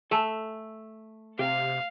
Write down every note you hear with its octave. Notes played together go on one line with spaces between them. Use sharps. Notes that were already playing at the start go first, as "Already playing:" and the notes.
A3 A4 G#5 A5
C3 G4 F5